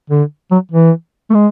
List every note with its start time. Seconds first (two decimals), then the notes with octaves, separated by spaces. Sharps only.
0.10 D3
0.51 F#3
0.72 E3
1.30 A3
1.34 G#3